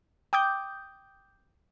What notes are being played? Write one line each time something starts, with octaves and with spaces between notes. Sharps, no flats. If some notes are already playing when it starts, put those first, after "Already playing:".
G5 D6 D#6 G6